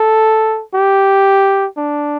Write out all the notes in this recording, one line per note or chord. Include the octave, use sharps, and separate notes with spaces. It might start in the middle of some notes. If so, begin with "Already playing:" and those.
Already playing: A4
G4
D4